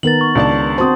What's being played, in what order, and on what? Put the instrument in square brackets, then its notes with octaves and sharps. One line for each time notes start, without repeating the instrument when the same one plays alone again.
[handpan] D#3 B3 A#4 [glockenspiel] A6 F#7
[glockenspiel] C#6
[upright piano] C#2 D5 A5 [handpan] D4
[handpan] C4 F#4 C5 [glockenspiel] A5 D#6